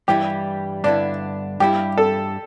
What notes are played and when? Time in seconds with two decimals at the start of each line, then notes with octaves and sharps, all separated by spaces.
0.08 G2 E3 G3 E4 G4
0.84 G2 D3 B3 D4 E4
1.60 G2 G3 E4 G4
1.98 A4